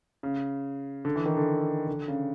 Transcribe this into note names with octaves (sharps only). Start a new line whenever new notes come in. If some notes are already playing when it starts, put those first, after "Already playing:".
C#3
D3
E3
D#3
D3
D3
C#3